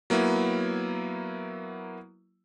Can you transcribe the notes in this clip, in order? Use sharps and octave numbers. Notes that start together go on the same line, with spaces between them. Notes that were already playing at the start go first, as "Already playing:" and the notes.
F#3 A#3 B3 E4